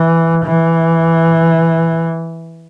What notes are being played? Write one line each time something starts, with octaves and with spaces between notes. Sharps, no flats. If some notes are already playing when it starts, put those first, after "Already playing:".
Already playing: E3
E3